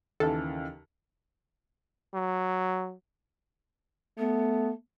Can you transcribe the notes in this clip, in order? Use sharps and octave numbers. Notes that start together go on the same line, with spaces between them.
D#2 C#3 E3 A4
F#3
A3 B3